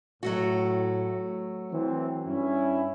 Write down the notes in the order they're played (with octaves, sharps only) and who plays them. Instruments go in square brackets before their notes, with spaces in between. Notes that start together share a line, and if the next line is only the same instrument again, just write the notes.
[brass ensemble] A2 [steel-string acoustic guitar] F#3 A3 F#4
[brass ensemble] E3 C4
G2 C#4 E4